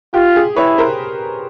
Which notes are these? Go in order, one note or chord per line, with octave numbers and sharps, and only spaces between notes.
F4 G4
G#4
E4 B4 C#5
A#4 C5